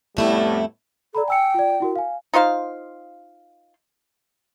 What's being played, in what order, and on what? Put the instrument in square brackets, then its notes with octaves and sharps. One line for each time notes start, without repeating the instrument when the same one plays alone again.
[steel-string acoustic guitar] F2 A3 E4 [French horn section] A2 G3 B3
[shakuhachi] A4 [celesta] D5 A#5 B5
[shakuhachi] G5 [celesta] G#5 E6 C#7
[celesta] F4 D5
E4 F#4 A#4
F5 G#5
[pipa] D#4 F4 C5 F5